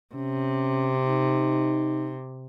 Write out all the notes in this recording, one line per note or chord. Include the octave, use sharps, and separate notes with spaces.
C3 C#4
D#4